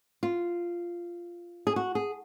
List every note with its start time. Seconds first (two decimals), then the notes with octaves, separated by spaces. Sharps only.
0.23 F4
1.67 G#4
1.76 F#4
1.95 G#4